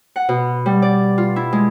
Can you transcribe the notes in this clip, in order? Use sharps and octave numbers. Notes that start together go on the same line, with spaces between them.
F#5
B2
G3
D5
F4
E4
G#3